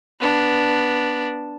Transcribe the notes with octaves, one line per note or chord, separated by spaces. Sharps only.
B3 D4